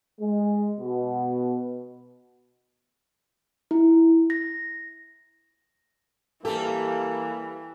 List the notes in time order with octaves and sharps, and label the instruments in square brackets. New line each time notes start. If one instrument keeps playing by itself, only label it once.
[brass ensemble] G#3
B2
[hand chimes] E4
A#6
[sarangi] E3 [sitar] G3 G4 [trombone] A#3 [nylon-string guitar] A4